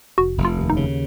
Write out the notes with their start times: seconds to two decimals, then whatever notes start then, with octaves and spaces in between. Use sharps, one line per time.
0.18 F1 F#4
0.38 F1
0.45 F4
0.58 D#2
0.70 D#4
0.77 C#3